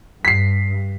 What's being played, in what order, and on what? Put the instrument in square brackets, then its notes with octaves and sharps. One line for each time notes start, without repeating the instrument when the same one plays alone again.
[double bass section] G2 [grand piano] B6 C7